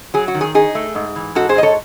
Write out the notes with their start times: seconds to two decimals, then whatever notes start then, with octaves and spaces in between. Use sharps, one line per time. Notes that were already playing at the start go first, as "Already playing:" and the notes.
0.14 F#3 G#4
0.28 F#4
0.34 D#3
0.41 G#4
0.55 D#4 G#4
0.75 A3
0.95 G#2
1.16 E3
1.35 G#2 F#4 A4
1.49 G#4 C5
1.55 G#2 D#5
1.63 A4 C#5